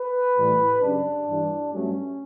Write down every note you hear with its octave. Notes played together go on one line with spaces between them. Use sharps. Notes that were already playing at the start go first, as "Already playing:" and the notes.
Already playing: B4
A2 E3 G3
F#2 C#3 G3 D4
G2 E3 G3
G2 F#3 A3 C#4